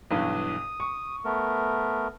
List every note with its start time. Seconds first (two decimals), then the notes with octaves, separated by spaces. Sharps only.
0.11 B1 G2 E3 D#6
0.80 C#6
1.25 A3 B3 A#4